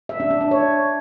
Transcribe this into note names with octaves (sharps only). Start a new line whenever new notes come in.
E5
D4
D4
D4
C#5